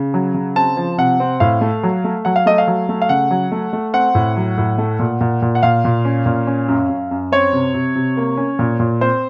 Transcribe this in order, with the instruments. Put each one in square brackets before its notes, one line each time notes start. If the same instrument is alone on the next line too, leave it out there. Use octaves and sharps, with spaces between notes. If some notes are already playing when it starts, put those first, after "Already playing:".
Already playing: [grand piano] C#3
F#3
C#3
C4 A5
F3
C3 F#5
C4
A2 F5
A3
F#3
A3
F#3 F#5
F5
A3 D#5
F5
F#3
A3
F5
C#3 F#5
F#3
A3
A3
C4 F#5
A2
F#3
A2
A3
A#2
A#2
A#2
F#5
A#2 F5
A#2
C#4
A#2
C#4
F#2
F#2
F#2
C4 C#5
C3
C3
C3
A#3
C#4
A#2
A#2
C4 C5